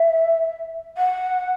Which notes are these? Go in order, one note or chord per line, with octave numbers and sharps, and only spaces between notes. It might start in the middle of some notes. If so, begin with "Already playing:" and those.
Already playing: E5
F#5